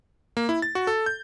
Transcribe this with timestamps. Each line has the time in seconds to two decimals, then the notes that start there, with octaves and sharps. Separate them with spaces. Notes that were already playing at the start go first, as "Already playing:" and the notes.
0.37 A#3
0.49 E4
0.62 A6
0.75 F#4
0.87 A4
1.06 G6